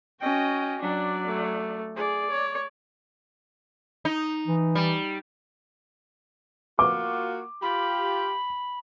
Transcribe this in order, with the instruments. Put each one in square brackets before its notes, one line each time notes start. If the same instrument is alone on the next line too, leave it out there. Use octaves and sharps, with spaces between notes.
[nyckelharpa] C#4 F#4 [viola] D#5 G5
[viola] F#3 D5 [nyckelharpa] D4
[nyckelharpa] A3
[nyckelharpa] G#4 [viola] D5
[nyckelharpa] C#5
[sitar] D#4
[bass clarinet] E3
[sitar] G3
[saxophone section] A#3 F4 F#4 [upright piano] D6
[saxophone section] F4 G4 [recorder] B5